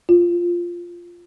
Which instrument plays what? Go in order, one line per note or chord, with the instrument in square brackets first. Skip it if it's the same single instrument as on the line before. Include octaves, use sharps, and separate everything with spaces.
[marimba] F4